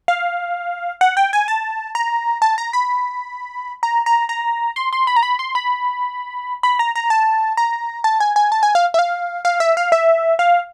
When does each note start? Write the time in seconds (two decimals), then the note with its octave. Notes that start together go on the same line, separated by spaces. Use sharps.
0.08 F5
1.01 F#5
1.17 G5
1.33 G#5
1.48 A5
1.95 A#5
2.42 A5
2.58 A#5
2.73 B5
3.83 A#5
4.06 A#5
4.29 A#5
4.76 C6
4.93 C6
5.07 B5
5.16 A#5
5.23 B5
5.39 C6
5.55 B5
6.63 B5
6.79 A#5
6.96 A#5
7.10 A5
7.57 A#5
8.04 A5
8.20 G#5
8.36 G#5
8.52 A5
8.63 G#5
8.75 F5
8.94 E5
8.99 F5
9.45 F5
9.60 E5
9.77 F5
9.92 E5
10.39 F5